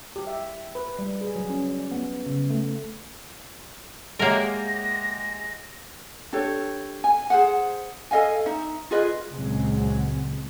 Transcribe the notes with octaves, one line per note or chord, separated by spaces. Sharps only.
G4
E5
B4
G3
G#4
F#3
C#4
D5
B3
C#3
A3
G#3 A#3 G4 A#4 C#5 E5 F#5 A#6
D4 G4 A4 C#5
G#5
G#4 C5 F#5
A4 D#5 F5 G#5
D#4 E5
F4 G#4 B4 D#5
C#2 A#2 C#3 F#3 G#3 C4